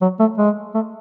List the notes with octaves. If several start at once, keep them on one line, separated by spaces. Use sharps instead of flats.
F#3
A3
G#3
A3